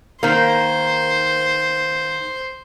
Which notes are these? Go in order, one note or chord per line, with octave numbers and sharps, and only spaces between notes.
D#3 A#3 C5